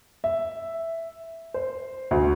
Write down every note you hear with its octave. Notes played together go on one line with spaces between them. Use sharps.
E5
C5
D2